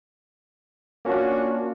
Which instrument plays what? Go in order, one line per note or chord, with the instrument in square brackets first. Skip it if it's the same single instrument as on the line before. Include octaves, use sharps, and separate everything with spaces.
[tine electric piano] A#3 C#4 [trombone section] D4 F4 F#4